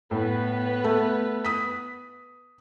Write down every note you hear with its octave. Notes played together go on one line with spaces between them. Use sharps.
A2 B3 B4
A3
D#6 B6